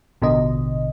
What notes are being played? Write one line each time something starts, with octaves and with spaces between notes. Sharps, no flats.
A1 B2 D3 D#5